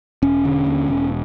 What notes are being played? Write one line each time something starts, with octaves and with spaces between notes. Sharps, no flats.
E1 C#4
D3
D#2
E1